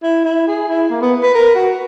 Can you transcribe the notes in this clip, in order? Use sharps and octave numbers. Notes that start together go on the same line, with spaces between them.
E4
E4
G#4
E4
A#3
B3
B4
A#4
F#4